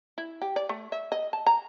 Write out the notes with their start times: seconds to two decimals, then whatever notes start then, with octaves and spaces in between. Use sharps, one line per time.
0.18 E4
0.42 G4
0.56 D5
0.69 A3
0.92 E5
1.12 D#5
1.33 A5
1.46 A#5